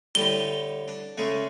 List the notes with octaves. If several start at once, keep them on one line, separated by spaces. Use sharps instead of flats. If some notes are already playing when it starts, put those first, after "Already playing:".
A2 D3 G3 G7
D4
C#3 G#3 A3